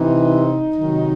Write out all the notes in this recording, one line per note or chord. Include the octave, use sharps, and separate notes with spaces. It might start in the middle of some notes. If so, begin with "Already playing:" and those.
Already playing: C3 E3 C4 D#4
C3 D#3 F#3